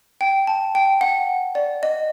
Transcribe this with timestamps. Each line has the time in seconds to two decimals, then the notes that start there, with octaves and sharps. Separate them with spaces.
0.21 G5
0.47 A5
0.75 G5
1.01 F#5
1.55 D5
1.83 D#5